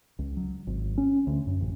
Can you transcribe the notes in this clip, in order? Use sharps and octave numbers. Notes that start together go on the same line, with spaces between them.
C#2
F#3
G#1
C#4
D2
F#2
A1